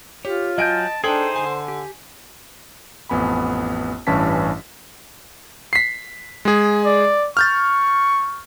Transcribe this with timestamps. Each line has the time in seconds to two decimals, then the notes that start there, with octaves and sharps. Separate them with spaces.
0.25 F4 G4 C#5
0.58 F#3 D#5 G#5 A5 G6 D7
1.04 D4 D#4 G#4 A4 C5 G5 F#7
1.36 D3 G#5
1.68 G4
3.09 A1 F2 B3 G#5 B5
4.07 A1 G2 E3 C#4 A5 B6
5.73 B6 C7
6.45 G#3 G#4
6.85 D5
7.37 C#6 F6 G6 A6